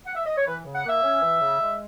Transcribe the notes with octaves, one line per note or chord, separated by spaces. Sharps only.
F#5
E5
D#5
C#5
E3 B4
C#3
F#5
A#3 E5
C#4
E3
C#3
G#3